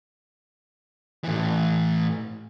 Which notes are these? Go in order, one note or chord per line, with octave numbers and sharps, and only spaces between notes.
A2 E3